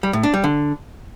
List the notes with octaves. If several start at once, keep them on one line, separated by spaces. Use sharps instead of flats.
G3
A2
D4
G3
D3